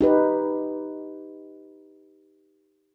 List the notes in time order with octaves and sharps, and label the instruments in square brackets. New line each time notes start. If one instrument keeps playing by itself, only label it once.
[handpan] D#4 G4 B4